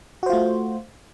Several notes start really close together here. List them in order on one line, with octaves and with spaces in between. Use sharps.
F#4 C5 F4 A3